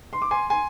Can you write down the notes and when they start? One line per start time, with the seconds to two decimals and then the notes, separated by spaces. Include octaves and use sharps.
0.13 C6
0.22 D6
0.31 G#5 C6
0.50 G#5 C6